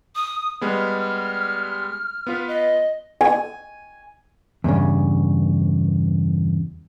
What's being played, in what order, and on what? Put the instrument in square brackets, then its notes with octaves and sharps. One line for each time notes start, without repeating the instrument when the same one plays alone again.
[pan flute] D#6
[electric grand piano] G3 G#3 B3 [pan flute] F6
[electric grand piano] B3 F4 B4
[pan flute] D#5
[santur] G#5
[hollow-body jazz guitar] E2 G2 A#2 C#3